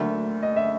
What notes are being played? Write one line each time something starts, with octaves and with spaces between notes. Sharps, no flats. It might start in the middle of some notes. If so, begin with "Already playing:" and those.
Already playing: D2 D3 F#3 A#3 E5
D#5
E5